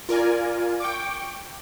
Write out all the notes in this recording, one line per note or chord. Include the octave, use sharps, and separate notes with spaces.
F4 A#4 D5 G#5
G5 C#6 D6